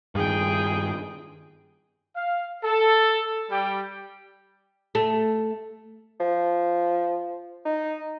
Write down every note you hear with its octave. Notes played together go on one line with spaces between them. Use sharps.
G2 D#3 G#4 G5
F5
A4
G3 G5
A3
F3
D#4